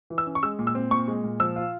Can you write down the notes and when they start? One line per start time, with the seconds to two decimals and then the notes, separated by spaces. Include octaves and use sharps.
0.10 E3
0.18 E6
0.27 C#4
0.35 C#6
0.43 G#3 E6
0.59 A#2
0.67 E6
0.75 C4
0.91 A#2 C#6
1.08 G#3
1.24 A#2
1.40 F3 E6
1.56 F4